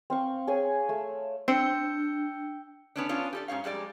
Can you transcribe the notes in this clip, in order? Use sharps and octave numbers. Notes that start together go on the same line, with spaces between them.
C4 F5 C#6
G#4 C#5 G#5
A3
C4 D4 G5 E6 G6 C#7
B3 C#4 D4
B3 C#4 D4 F4
G4 A4 D5
G#2 C#4 C#5 F5
F2 G3 G#3 D5